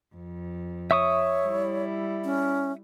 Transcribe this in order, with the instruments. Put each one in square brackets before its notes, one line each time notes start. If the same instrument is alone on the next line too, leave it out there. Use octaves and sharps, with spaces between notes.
[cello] F2
[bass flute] C#5 [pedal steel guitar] E5 C#6 D#6
[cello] G3 E4
[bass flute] C#4